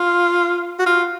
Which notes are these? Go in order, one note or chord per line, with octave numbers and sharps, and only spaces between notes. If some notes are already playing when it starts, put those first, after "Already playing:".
Already playing: F4
F#4
F4